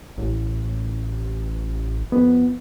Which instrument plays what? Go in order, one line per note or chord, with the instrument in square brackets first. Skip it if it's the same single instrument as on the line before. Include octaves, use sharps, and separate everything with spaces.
[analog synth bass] A1
[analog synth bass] F2 [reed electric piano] B3